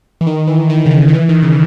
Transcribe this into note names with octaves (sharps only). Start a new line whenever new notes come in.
E3
D#3
E3
D#3
C#3
D#3
D#3
E3
D#3
C#3